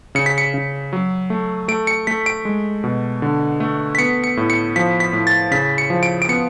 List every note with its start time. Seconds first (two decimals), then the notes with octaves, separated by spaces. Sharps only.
0.15 C#3 C#7
0.26 B6
0.38 C#7
0.54 C#3
0.93 F#3
1.30 A3
1.68 A3 D7
1.87 C#7
2.07 A3 B6
2.26 D7
2.45 G#3
2.84 B2
3.22 D3
3.60 A3
3.95 B6
3.99 B3 C#7
4.24 C#7
4.37 A2
4.50 C#7
4.76 F3 B6
5.00 B6
5.13 A2
5.27 A6
5.51 C#3 B6
5.78 C#7
5.90 F3
6.03 D7
6.22 D7
6.29 B3 C#7